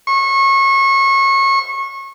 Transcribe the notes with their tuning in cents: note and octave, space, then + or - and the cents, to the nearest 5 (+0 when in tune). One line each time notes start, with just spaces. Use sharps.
C#6 -30